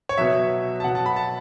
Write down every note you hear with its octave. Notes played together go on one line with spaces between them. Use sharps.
C#5
B2 F#3 E5
A5
B2 F#3 F#5
A5
B5
A5